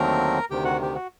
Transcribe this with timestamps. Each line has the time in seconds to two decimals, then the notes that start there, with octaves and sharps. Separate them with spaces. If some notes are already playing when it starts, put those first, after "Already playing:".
Already playing: D#2 D3 F#3 A3 C4 A#4 A#5
0.50 D2 C3 D#3 G4 G5
0.64 F#4 F#5
0.82 G4
0.94 F#4